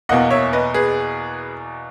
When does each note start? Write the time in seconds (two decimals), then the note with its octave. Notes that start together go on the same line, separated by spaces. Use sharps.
0.09 E2 B2 A#3 D#5 F#5
0.30 C#5 E5
0.53 B4 D#5
0.74 G#4 B4